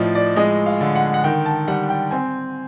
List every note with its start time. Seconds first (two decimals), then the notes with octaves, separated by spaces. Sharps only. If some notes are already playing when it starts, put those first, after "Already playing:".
Already playing: A2 F3 D5 D#5
0.15 D5
0.36 G#3 D#5
0.66 F5
0.81 D3
0.96 F#5
1.14 F#5
1.24 D#3 G5
1.45 A5
1.68 G3 F#5
1.89 G5
2.11 C4 G#5